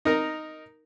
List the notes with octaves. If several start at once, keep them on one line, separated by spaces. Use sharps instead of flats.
D#4 A#4 A#5